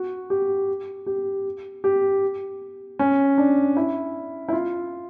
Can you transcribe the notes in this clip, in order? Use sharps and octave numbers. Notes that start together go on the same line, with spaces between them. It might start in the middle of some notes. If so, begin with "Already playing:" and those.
Already playing: F#4
G4
G4
G4
C#4
D4
E4
E4
F4